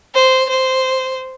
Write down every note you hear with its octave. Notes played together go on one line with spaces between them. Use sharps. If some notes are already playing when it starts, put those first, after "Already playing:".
C5
C5